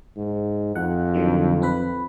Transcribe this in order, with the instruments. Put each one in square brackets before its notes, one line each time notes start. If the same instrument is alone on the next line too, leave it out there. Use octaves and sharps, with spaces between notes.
[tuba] G#2
[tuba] F2 [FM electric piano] F#5
[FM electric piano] D3 D#3 F#3
C4 B4 B5